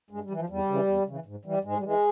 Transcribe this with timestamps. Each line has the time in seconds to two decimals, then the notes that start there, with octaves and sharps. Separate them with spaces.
0.10 G2 G#3
0.24 G3
0.30 E3
0.36 F3
0.49 E2 G3
0.69 C#3 E3
0.87 E2
1.06 C#3 E3
1.26 G#2
1.45 E3 G3
1.64 G#2 G#3
1.78 G3
1.84 E3 G#3